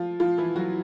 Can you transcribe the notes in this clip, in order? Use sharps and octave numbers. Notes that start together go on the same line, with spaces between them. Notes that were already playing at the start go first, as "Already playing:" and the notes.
Already playing: F3 F4
F3 F4
E3 E4
F#3 F#4